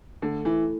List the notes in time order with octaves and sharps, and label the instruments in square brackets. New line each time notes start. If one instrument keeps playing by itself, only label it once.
[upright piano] D3 [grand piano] A3
[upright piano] E3 [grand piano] E4